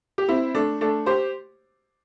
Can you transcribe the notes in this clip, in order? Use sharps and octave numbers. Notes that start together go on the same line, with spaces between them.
G4
C4 E4
A3 D4
A3 D4
G4 C5